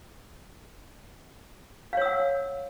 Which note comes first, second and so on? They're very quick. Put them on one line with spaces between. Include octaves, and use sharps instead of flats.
F5 C#5 E6 F#5